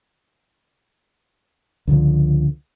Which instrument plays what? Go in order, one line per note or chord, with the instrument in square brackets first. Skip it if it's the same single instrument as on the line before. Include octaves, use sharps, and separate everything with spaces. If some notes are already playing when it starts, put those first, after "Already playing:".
[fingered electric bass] C#2 D3 F3